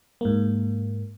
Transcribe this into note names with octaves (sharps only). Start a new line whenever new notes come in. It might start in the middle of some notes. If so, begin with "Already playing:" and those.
G#2 A#3